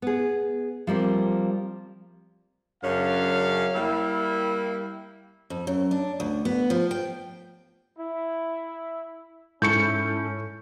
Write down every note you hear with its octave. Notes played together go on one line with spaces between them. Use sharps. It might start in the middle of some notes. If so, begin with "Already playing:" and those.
B3 G#4
F3 G3 A#3 C4
F#2 C#3 C#4 D4 F5
G3 A#3 E4
F2
F#2
D4
D2
B3
F3
G5
E4
G#2 C#4 E4 A4 C#6 G6 C#7